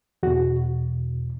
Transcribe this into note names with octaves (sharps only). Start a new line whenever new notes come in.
E2 B2 F#4